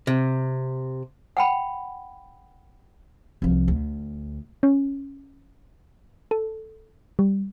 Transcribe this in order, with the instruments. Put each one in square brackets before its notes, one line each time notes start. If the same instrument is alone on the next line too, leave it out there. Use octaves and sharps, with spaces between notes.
[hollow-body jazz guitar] C3
[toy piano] F#5 G5 B5
[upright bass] C2 F3
D2
[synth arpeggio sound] C#4
A4
G3